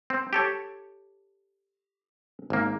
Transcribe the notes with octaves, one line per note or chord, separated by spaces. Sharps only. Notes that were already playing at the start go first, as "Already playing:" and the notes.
C4
G4 A4 C#5
G#1 A#3